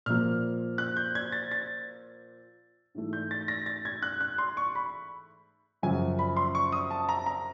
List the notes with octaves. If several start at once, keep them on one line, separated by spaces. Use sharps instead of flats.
A#2 F3 A#3 F6
F#6
G6
G#6
A6
A6
G#2 E3 A3
G6
A6
A#6
A6
G#6
F#6
F#6
C6
C#6
B5
F#2 C#3 F3 G#5
B5
C6
C#6
D#6
A5
A#5
A#5